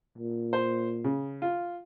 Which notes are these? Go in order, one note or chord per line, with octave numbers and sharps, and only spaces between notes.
A#2
C5
C#3
F4